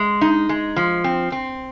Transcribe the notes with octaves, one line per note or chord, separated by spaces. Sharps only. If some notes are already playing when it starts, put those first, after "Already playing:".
Already playing: G#3
D#4
G#3
F3
C4
C4